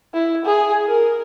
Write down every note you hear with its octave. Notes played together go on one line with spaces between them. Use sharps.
E4
G#4
A#4